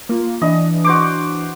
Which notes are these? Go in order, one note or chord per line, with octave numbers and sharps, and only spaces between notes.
A#3 F4
E3 D4 D#5
F#4 C5 D6